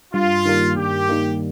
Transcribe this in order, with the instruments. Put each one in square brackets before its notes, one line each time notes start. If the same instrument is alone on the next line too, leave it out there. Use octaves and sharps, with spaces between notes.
[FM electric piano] G2 [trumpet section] F4
[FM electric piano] D#3 G3 A#3
[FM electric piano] G2 [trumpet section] G4
[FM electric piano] D#3 G3 A#3